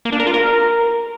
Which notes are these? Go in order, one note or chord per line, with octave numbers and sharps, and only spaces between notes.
A#3
D4
A#4
F4
A#4